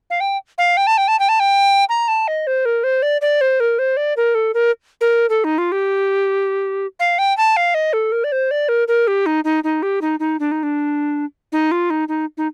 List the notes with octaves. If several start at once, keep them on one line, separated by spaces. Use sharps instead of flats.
F5
G5
F5
G5
A5
G5
A5
G5
A5
G5
A#5
A5
D#5
C5
A#4
C5
D5
D5
C5
A#4
C5
D5
A#4
A4
A#4
A#4
A4
D#4
F4
G4
F5
G5
A5
F5
D#5
A4
A#4
D5
C5
D5
A#4
A#4
G4
D#4
D#4
D#4
G4
D#4
D#4
D4
D#4
D4
D#4
F4
D#4
D#4
D#4